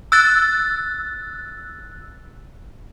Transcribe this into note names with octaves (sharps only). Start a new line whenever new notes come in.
E6 F#6 A6